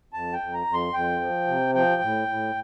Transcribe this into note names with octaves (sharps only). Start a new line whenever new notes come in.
F2 A5
G5
F2
A#5
F2
C6
F2 G5
F3
C3
F3 G5
A2
A2